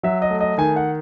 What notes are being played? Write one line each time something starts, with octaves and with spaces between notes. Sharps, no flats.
F#3 E5
D#5
A3
D#5
D#3 G#5
F#5